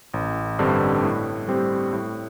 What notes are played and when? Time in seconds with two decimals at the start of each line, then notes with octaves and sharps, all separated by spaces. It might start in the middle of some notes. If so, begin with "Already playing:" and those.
0.14 A1
0.59 G2 D3 G3 C4
1.03 A2
1.48 G3 C4 G4
1.93 A2